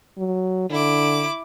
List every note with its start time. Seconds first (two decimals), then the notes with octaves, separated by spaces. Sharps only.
0.18 F#3
0.70 D3 E4 D6